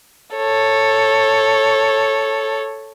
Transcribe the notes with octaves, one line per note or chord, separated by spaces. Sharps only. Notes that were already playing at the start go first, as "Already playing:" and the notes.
A4 C#5